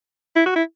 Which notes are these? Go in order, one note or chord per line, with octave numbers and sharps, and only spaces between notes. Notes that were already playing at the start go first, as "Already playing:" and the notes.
E4
F#4
E4